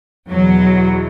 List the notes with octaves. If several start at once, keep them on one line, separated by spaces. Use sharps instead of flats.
E2 B2 F#3